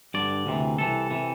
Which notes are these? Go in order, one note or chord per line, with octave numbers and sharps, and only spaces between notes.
G2 D3 D5
D2 C3 E3
C2 C3 E3 A4
C3 E3